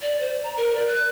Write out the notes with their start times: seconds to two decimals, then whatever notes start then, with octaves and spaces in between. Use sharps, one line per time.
0.02 D5
0.21 C5
0.43 A#5
0.57 A#4
0.75 D5
0.87 F#6